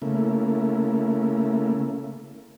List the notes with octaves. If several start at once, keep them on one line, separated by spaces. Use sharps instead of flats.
C#3 A3 A#3 E4